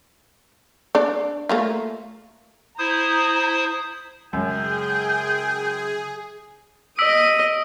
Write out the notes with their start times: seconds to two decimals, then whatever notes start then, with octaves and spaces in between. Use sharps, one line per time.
0.95 D4 D5
1.49 A3 A#3 F4
2.79 E4 C5 A#5 D#6
4.33 F#2 C#3 G#3 G#4 G5
6.99 D#5 D#6 E6 B6 D7